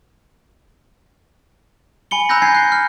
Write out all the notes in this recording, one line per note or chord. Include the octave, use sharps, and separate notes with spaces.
G#5 B5 C#7 G7
A#5 B5 E6 F#6 G6 A#6
G#5 G6 G#6 C7
F#6 C7
F6